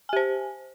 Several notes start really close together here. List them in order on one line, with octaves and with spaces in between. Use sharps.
G#5 G4 C5